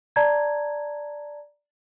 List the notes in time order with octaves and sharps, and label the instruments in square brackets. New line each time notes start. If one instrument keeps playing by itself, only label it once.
[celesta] D5 A5 A#5 G#6